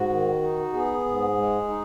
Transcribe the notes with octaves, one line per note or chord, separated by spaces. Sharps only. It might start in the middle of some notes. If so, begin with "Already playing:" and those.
Already playing: G#2 F#4
D#3
D#4
B3 G#4
G#2
G#3
D#4